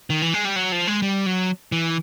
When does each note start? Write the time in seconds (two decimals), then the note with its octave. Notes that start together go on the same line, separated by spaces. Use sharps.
0.10 D#3
0.22 E3
0.34 G#3
0.45 G3
0.56 F#3
0.72 F3
0.87 G#3
1.02 G3
1.26 F#3
1.72 E3